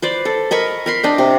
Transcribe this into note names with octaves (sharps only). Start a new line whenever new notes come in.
B4 C5 D5
A4
A#4 D#5 B5 C#6
A#4 B5 C6
D4 D#5 G5
C3